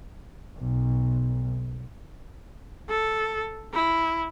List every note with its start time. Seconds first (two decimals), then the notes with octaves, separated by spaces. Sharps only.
0.57 B1
2.89 A4
3.73 E4